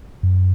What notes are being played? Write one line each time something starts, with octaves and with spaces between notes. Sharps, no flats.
F#2